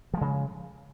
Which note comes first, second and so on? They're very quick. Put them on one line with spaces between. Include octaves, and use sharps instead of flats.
F3 G#3 C#3